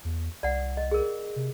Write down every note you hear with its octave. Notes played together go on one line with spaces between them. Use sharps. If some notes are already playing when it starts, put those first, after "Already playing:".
E2
C2 D5 F#5
D#5
G#4 A#4
C3